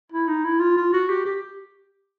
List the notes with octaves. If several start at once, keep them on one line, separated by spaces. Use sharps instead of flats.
E4
D#4
E4
F4
F4
F#4
G4
G4